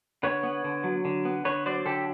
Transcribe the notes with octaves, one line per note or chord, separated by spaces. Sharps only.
D3 B4 C#5
B3
D3
F#3
D3
B3
D3 B4 C#5
F#3 C5 D5
D3 G4 A4